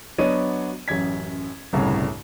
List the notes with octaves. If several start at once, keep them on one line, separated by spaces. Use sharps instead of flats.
F#3 B3 D4 C#5 D#5 D#7
A1 F#2 G#6 B6
G1 C2 A2 C#3 A#5